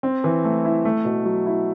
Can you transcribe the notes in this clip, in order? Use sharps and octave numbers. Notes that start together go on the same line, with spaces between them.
C4
E3
A3
E4
A3
B2
F#3
E4